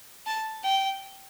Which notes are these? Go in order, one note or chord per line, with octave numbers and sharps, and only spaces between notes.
A5
G5